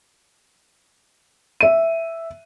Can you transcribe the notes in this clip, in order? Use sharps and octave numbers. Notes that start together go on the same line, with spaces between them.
E5 D#7